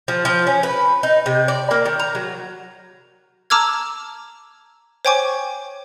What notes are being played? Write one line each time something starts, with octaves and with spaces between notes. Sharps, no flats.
F3
F3
C#4
B4
D#4
C3
D5
A#3
D#3
A#5
F#3
A5 A#5 D6 E6 F6 G#6
C5 C#5 G5 G#5 C#6 D6